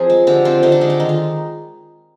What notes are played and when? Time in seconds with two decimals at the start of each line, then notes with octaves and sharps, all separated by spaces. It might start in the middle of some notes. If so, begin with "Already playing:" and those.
Already playing: F3 C4 G#4 A#4
0.10 G#3
0.27 D3 G4
0.45 C4 F4
0.63 D3 D#4
0.72 D4
0.81 G#3 D#4
0.90 D4
1.00 D#3 D#4
1.09 F4